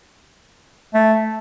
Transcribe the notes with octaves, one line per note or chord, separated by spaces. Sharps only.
A3